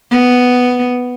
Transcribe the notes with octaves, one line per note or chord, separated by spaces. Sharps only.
B3